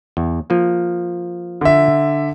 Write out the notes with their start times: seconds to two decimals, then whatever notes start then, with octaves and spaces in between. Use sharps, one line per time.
0.17 E2
0.50 F3 A#3
1.61 D3 E5